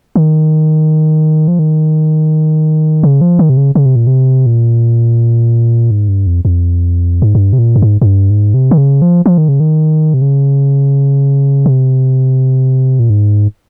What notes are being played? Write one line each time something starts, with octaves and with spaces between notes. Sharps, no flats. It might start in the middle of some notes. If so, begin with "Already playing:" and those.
D#3
F3
D#3
C#3
F3
D#3
C3
C#3
C#3
C3
A#2
C3
A#2
G#2
G2
F2
F2
G#2
G2
C3
A#2
G2
G#2
G#2
G2
G#2
C3
D#3
C#3
F3
F3
D#3
C#3
D#3
C3
C#3
C3
A#2
G#2